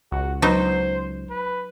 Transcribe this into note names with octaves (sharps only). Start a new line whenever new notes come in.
C#2 F#4
F#3 B3 D#4 C5
B4